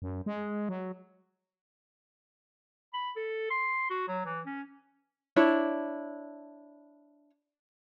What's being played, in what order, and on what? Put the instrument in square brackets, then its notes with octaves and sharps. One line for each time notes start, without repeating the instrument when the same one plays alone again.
[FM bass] F#2
G#3
F#3
[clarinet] B5
A4
C6
F#4
F#3
E3
C#4
[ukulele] D4 E4 C#5